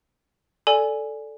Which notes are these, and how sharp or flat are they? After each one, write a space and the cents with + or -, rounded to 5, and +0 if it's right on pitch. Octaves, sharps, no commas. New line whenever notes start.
A4 +0 D5 -10 G#5 +0